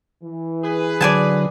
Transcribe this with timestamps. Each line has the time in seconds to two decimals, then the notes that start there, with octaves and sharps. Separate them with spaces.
0.23 E3
0.64 G#4 B4
1.01 D3 F#3 D5 G#5 A5